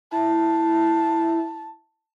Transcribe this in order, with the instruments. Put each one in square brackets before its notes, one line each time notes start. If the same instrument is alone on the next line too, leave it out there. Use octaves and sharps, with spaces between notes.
[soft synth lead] E4 [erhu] A5